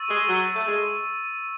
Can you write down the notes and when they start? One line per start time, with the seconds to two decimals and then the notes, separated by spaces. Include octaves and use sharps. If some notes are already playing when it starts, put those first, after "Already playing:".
Already playing: C#6 E6 A6 D#7
0.09 G#3
0.28 F#3
0.55 A3
0.66 G#3